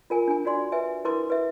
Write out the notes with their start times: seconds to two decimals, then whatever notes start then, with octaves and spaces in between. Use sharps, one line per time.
0.10 F4 A#4 G#5
0.28 D4 G#5
0.45 D4 F#4 D5 C6
0.72 B4 E5 G#5
1.05 E4 A#4 B4 C6 D6
1.30 B4 E5